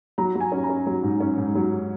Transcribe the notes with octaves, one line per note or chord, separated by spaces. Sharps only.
F#3 A#5
F#3
G#5
C#4
A#5
C#4
F#3
G#2
C#4
G#2
F#3